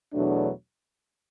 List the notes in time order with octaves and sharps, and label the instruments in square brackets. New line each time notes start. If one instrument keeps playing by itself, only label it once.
[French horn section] E2 B2 F#3 A3 D4